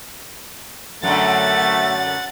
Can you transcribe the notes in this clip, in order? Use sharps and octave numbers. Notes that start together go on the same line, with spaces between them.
F#2 D3 A3 F#5 A6